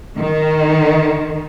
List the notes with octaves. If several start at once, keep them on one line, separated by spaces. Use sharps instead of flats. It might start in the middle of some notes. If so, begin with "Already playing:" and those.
D#3